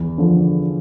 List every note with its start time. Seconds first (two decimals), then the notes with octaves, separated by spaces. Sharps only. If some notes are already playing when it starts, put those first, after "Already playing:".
Already playing: E2
0.18 D3 F3